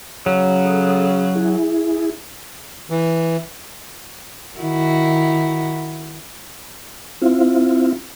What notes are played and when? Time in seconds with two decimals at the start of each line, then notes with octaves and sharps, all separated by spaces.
0.26 C#3 F#3
0.65 A4 D#6
1.36 E4 G#4
2.90 E3
4.60 D#3 E4 F#4
7.21 C4 E4 F4